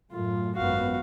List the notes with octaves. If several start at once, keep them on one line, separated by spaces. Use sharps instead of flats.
F#2 A2 A3 F4
G#1 F#2 B3 F#4 F5